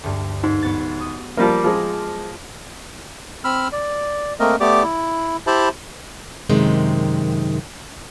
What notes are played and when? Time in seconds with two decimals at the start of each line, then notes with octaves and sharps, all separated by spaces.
0.03 D2 G2
0.43 G#2
0.63 F#3 B3 A6
1.00 D#6
1.37 F3 G3 A#3 F4 A#4 D6
1.64 F3 G#3
3.44 C4 B5 E6 F6
3.72 D5
4.40 A3 A#3 C4 A#4 D#5
4.60 A3 B3 G4 D5 D6
4.83 E4
5.47 E4 G4 C5 E5 A5 B5
6.50 F#2 C3 D#3 G#3